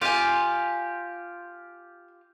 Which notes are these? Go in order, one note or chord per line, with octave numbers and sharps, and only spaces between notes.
F4 G4 F5 G#5